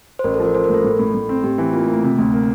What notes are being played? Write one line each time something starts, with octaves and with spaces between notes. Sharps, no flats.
C5
A1 A#4
A4
F3
A#4
F3 C5
A#4
A2 A4
A2
A2
A2
C4
A2 G4
E3
A#3 F4
A3
A#3
A3
C3
D2
A#3